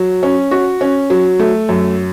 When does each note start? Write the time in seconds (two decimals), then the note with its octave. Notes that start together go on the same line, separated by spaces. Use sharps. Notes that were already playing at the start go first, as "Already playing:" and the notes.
Already playing: F#3
0.23 C#4
0.51 F#4
0.81 C#4
1.10 F#3
1.39 A3
1.69 F#2